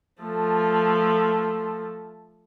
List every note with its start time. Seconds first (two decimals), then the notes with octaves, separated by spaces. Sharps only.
0.22 F3 A3